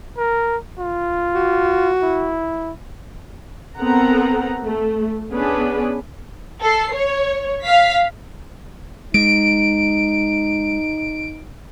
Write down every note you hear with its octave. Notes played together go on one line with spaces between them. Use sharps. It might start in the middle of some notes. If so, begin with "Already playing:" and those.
A#4
F4
F#4
E4
B3 C4 A4 A#4 F#5 A#5
A3
B3 C#4 D4 G#4 B4
A4 C7
C#5
F5 B6
G#3 D#4 D7